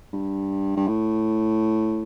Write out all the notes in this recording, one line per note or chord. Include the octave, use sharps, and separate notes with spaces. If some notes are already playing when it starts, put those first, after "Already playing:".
G2
G2
A2